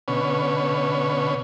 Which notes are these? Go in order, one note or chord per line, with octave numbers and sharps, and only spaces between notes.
B2 D3 C#4 B4 C#5